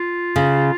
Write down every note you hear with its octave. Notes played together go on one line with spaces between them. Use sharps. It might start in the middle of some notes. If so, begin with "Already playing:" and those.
Already playing: F4
C#3